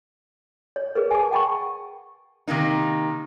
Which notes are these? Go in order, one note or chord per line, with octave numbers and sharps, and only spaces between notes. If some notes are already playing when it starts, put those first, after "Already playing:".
C#5
G#4 A#4 B4
G#5 A5 D6
F#5 G5 A5 B5 C#6
C3 D#3 A#3 D#4